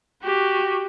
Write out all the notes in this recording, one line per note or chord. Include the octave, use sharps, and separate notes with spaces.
F#4 G4